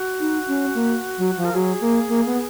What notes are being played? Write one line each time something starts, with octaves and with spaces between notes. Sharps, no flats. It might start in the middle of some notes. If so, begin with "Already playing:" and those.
Already playing: F#4
D#4
C#4
A#3
F#3
F3
A#4
F#3 G#4
A#3
A#3
B3